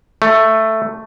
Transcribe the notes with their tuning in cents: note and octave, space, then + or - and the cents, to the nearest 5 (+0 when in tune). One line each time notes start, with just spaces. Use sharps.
A3 +5